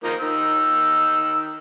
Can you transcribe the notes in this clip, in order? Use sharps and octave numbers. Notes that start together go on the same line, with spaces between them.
F3 A#3 D#4
D#3 D#4 E6